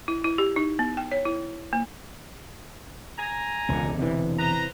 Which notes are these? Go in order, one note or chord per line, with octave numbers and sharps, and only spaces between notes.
E4
E4
G4
D#4
B3
G5
C#5
E4
A#3
G#5 A#5
E1 C#2 D3
C3 E3
B4 C5 A#5